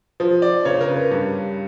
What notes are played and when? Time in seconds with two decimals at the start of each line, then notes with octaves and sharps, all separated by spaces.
0.20 F3
0.42 D5
0.65 C#3 C#5
0.81 A#4
0.89 B4
1.11 G2